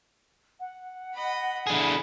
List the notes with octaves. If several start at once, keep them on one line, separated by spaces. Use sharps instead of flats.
F#5
D#5 B5
D3 E4 G#4 A4